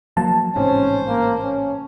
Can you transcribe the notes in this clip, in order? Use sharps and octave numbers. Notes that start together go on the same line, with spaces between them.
F3 F#3 A#3 A5
A1 G#2 C3 C#4 C5
A#3
C#4